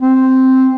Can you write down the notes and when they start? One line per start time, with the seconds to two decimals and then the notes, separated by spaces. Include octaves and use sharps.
0.01 C4